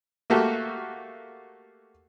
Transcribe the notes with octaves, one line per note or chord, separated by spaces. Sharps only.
A3 A#3 F#4 G4 A4